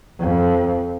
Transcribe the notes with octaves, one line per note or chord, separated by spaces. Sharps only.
F2